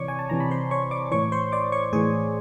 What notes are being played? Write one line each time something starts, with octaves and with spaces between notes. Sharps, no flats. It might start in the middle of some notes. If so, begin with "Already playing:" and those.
Already playing: C3 E3 C#5 D5 C#6 D6
G#5
A5
C3 E3 A#5
B5
C5 C6
C#5 C#6
D5 D6
A2 E3 C#5 C#6
C5 C6
D5 D6
C#5 C#6
A2 E3 G#4 G#5